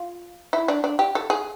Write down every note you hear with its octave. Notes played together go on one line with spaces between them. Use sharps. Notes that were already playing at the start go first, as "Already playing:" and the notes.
Already playing: F4
E4
D4
D4
G4
A4
G#4